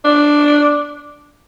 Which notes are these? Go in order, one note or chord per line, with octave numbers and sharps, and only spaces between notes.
D4